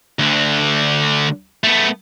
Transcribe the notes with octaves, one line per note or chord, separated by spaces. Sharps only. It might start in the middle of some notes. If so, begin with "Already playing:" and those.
D2 D3
A3 B3